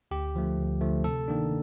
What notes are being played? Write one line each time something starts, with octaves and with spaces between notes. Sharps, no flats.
D2 G4
D3 F3 A3
D2
D3 F3 A3
C3 A4
D#3 A#3 D4